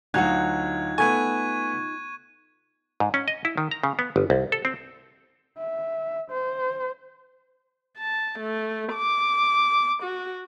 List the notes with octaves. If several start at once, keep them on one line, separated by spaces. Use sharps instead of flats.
D2 F#3 D#4 F4 F#4 F#5 F#6 G#6
A3 B3 G#5 C#6 G#6 D#7
G#2
C#4
D#5
E4
D#3
A#5
C#3
B3
G1
C2
A4
C4
E5
C5
A5
A3
D6
F#4